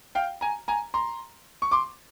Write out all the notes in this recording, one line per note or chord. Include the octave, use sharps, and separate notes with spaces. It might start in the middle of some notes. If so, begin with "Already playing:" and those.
F5 G5
G#5 A#5
G#5 A#5
A#5 C6
C#6
C6 D6